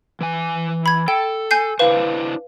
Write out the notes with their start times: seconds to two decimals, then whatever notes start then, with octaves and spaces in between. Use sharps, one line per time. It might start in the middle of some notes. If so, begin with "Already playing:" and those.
0.21 E3 G#5
0.86 B5 G#6
1.08 A4 G5
1.51 G#5 G6 C7
1.79 D4 E4 B4 C5 F5